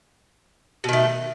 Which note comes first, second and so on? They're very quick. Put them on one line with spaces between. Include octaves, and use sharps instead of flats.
B2 D#3 A3